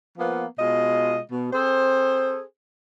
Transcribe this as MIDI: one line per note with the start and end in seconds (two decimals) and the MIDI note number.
0.18 0.45 53
0.18 0.45 58
0.18 0.45 59
0.59 1.20 47
0.59 1.20 56
0.59 1.20 65
0.59 1.20 75
1.31 1.48 47
1.53 2.41 60
1.53 2.41 68
1.53 2.41 69
1.53 2.41 72